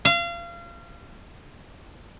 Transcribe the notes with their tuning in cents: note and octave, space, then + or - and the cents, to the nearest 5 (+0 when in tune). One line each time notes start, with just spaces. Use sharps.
F5 -30